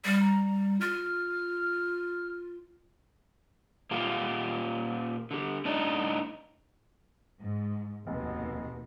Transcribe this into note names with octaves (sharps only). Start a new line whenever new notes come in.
G3
A#5
F4 F6
A#2 A#3 F4 G4
D3 G4
A2 D4 D#4 D5
G#2
F1 D#2 B2